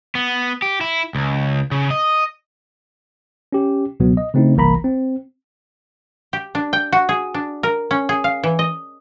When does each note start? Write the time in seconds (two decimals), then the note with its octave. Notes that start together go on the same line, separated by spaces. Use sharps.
0.15 B3
0.62 G4
0.81 E4
1.15 C#2
1.71 C#3
1.91 D#5
3.53 C#4 G4
4.00 C#2 B2 F#3 B3
4.17 D#5
4.34 C#3 A3 C4 D#4 E4
4.56 G1 C2 E3 A#3 A#5 B5
4.84 C4
6.33 G4
6.55 D4
6.73 G5
6.92 F#4
7.09 G#4
7.34 D4
7.63 A#4
7.91 C#4
8.09 G#4
8.24 F5
8.43 E3
8.59 D#5